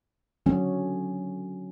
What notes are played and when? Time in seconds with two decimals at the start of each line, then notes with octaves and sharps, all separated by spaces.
0.46 D3 F#3 C#4